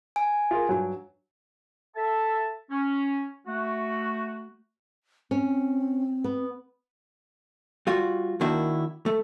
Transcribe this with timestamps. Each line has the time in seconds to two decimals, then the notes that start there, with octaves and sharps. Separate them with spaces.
0.16 G#5
0.51 F4 G#4 A#4
0.69 G2 F#3
1.95 A4 E5 A5
2.70 C#4
3.46 A3 F#4
5.31 C4 C#4
6.24 B3
7.87 G3 F4 F#4
8.41 D#3 A#3 D4 E4 F#4
9.06 A3